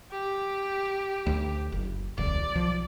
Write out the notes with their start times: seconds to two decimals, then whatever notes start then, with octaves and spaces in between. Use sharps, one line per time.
0.11 G4
1.26 D2
1.72 F#1
2.18 D#1 C2 D5
2.55 B1 F3